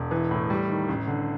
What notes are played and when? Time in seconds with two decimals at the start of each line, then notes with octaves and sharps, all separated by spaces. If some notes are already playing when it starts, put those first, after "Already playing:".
Already playing: E1
0.11 E3
0.31 A2
0.50 G3
0.69 D#3
0.88 A1
1.07 D3